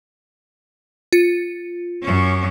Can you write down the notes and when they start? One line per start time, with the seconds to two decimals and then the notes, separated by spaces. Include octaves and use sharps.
1.13 F4 C#7
2.02 F#2 C#4